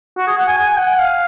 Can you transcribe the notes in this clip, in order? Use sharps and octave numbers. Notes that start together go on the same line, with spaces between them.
F#4
G#4
F#5
G#5
G#5
F#5
F5